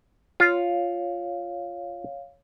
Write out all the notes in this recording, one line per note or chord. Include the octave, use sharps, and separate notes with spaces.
F4 C#5 F5